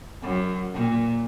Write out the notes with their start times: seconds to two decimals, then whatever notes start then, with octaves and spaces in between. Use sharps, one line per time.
0.22 F#2
0.73 A#2